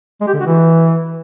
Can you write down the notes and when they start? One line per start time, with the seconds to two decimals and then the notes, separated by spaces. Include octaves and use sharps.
0.21 G#3
0.27 G4
0.34 D3
0.40 F#4
0.46 E3